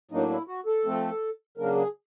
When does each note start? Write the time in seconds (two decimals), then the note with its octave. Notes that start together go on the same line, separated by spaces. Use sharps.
0.11 A2 F#3 A#3 D4 D#4
0.30 E4
0.48 F#4
0.66 A4
0.85 F3 A3 C4
1.57 C#3 F#3 A#3 D4 A#4
1.75 G#4